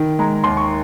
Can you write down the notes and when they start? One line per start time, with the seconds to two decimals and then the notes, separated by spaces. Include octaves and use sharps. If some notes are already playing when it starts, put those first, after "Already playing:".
Already playing: D#3
0.19 G#3 A#5
0.44 D#2 C6
0.57 C#6